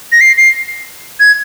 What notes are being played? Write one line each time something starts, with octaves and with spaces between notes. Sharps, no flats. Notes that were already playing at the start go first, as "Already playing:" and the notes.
A#6
C7
C7
G#6